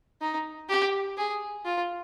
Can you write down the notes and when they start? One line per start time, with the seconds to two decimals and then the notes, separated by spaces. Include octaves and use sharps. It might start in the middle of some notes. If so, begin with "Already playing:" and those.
0.21 D#4
0.69 G4
1.18 G#4
1.65 F4